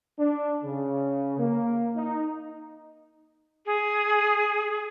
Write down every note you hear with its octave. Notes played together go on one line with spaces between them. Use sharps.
D4
C#3
A#3
D#4
G#4